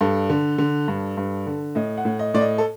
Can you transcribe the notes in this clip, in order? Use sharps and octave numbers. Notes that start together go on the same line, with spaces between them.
G2 A4
D3
D3
G2
G2
D3
A2 D#5
F#5
A2
D#5
A2 D5
D#5
A4